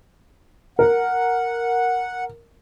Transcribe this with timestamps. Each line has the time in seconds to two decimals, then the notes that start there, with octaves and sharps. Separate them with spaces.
0.79 A#4 F#5